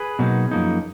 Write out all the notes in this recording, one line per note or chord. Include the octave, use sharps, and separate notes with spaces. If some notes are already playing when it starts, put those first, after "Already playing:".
Already playing: G#4 B4
B2 F#3 A#3 D#4
F#2 F3 A#3 D#4